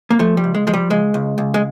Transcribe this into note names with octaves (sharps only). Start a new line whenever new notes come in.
A#3
F3 A3
G3
C#2
G#3
F3 G#3
G3
C#2 G#3
C#2
C#2
G#3